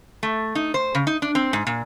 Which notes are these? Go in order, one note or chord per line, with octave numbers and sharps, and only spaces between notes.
A3
D#4
C5
C#3
D#4
D4
C4
G#2
A#2